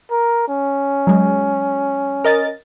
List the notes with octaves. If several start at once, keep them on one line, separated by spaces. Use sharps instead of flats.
A#4
C#4
F#3 G#3
A#4 D#5 A6